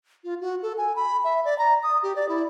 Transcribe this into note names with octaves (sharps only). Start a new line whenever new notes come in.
F4
F#4
A4
G#5
B5
E5
D5
A#5
D#6
G4
D5
E4